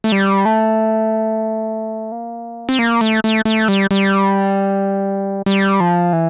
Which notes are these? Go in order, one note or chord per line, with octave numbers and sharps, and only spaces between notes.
A3
G3
A3
A#3
C4
A#3
A3
A3
A3
G3
G3
G3
F3
E3